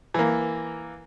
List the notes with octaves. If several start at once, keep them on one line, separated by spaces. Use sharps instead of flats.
E3 A#3